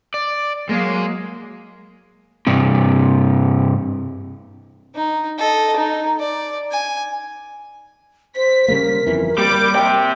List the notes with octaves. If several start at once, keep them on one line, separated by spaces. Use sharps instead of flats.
D5
F#3 G#3 A#3
G2 C3
D#4
A4 D#5
D#4
D5
G#5
C5 B6
C#3 G3 A#3 A#4
G1 F2 E3
G3 A#3 D6
C3 G5